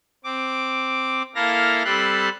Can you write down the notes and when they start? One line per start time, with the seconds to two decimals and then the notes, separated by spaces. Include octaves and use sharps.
0.24 C4 D6
1.35 A#3 E4 A4 F5 A#6
1.84 G3 C4 A4 B5 C6 F#6